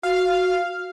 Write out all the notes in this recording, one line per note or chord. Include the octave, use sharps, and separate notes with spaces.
F#4 F5